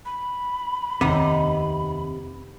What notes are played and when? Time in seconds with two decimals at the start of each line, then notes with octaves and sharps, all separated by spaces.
0.05 B5
1.01 F1 D#2 C3 B3 D#4